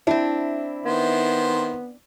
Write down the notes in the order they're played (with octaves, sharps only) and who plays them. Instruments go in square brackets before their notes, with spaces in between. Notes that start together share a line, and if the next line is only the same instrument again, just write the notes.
[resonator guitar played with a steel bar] C4 D4 [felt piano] E4
[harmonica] D#3 C5 [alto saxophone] B3